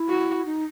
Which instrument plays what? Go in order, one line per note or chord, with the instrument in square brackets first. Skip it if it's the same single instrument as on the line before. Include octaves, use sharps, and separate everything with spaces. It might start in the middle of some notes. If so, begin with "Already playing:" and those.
Already playing: [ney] E4
[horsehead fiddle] F#4
[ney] D#4